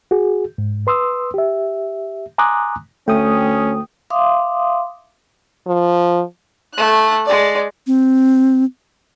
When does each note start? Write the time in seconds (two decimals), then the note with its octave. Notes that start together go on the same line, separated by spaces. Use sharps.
0.11 F#4 G#4
0.58 G#2
0.87 B4 C6 D#6 E6
1.34 G4 E5
2.38 G#5 A#5 C6 D6 D#6 F#6
3.08 D2 A3 C#4 G5 D#6
4.10 E5 F5 C6 D6 D#6
5.67 F3
6.74 A3 F#6
7.25 G#3 D5
7.87 C4